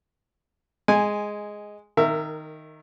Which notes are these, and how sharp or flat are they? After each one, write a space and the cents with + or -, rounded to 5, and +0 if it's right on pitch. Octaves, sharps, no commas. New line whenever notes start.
G#3 +0 G#5 -10
D#3 +0 A#4 -20 E5 +15